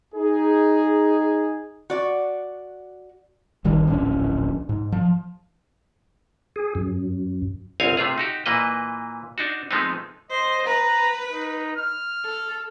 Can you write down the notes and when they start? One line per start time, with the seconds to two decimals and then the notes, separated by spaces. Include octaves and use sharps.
0.15 D#4 G#4
1.90 F#4 D5
3.65 G#1 D#3 G3
3.87 D1 A#1 C#4 D4
4.69 G#2
4.92 F3
6.56 G#4
6.75 F#2
7.80 G1 C2 C4 C#5 F5 G#5
7.97 C3 A3 F4 G#4
8.18 D#4 F#4 G4
8.46 A#2 E3 A#3 B4 D#5
9.38 D4 D#4 F#4
9.71 F3 G#3 A3 B3 C4 D#4
10.30 C5 D#5
10.67 B4 A#5
11.31 D#4
11.76 F6
12.25 A4